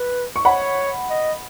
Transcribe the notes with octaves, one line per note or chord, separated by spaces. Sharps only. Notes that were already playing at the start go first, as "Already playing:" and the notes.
Already playing: B4
C#6
C#5 F#5 B5
D#5